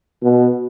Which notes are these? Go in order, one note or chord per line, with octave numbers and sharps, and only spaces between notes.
B2